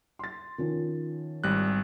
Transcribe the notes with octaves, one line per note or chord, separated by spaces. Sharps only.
C6 A6
D#3 F3 C#4
G#1 G3 F#6